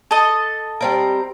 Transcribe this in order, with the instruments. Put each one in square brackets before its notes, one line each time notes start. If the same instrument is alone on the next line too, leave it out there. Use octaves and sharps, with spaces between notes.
[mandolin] A4 D#5
[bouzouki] G3 C4 A#4